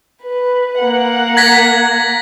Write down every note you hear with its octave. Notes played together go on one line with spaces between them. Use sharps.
B4
A#3 F#5
G#6 A#6 B6